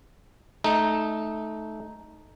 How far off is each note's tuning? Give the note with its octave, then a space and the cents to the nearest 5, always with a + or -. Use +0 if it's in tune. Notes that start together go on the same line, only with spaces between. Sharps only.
A3 -15 D#4 +0